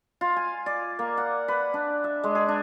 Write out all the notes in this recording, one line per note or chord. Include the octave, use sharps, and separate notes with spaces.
F4
G#5
D5
A#3
F#5
B4
D4
E5
G#3
G#4
D4